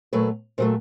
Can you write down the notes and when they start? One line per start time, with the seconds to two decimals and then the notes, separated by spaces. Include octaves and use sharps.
0.13 A#2 F#3 A3 B4
0.58 A#2 F#3 A3 C5